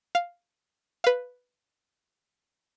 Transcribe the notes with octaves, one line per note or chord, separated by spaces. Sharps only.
F5
B4 F5